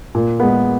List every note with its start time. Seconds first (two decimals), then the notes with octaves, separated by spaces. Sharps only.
0.15 A#2
0.40 G#3 B3